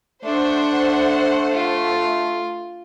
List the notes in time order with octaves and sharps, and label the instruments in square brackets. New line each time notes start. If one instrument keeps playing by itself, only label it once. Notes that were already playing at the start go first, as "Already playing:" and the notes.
[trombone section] A3 [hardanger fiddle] D4 [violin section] C5 F#5
[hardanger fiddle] F4